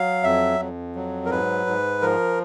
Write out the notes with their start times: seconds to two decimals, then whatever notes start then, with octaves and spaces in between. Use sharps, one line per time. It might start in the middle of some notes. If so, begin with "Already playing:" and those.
Already playing: F#3 F5
0.23 F2 E5
0.59 F2
0.95 F#3
1.26 A#4
1.31 G#2 B4
1.66 G#2
2.02 F3 A#4